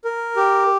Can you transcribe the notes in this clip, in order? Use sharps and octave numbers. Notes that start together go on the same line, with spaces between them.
A#4
G4